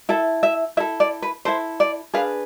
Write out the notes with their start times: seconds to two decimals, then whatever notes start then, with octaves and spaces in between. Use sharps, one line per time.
0.09 E4 A4 E5
0.43 E5
0.77 E4 E5
0.80 A4
1.00 D5
1.22 B4
1.45 E4 A4 C5
1.80 D5
2.14 D4 G#4 B4 F5